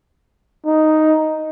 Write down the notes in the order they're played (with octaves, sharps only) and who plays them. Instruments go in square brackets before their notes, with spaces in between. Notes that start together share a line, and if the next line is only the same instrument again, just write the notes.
[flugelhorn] D#4